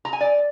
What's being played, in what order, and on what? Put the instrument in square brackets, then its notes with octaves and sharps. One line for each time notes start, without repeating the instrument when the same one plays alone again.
[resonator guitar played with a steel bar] A#5
G#5
D5